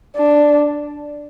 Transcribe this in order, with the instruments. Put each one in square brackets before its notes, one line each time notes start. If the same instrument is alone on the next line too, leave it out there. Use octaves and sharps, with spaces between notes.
[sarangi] D4